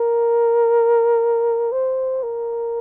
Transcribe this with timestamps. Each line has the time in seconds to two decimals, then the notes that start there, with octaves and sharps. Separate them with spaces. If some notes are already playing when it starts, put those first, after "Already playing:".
Already playing: A#4
1.72 C5
2.23 A#4